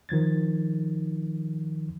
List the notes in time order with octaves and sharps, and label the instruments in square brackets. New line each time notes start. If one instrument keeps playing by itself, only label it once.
[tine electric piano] D#3 F3 G#6 A6